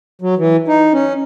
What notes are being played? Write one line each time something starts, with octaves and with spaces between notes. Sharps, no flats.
F#3
E3
D#4
C#4